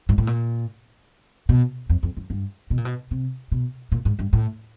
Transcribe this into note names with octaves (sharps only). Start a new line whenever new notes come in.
G#2
A2
A#2
B2
F2
F2
F#2
G2
B2
A#2
B2
C3
B2
A#2
G#2
G2
A2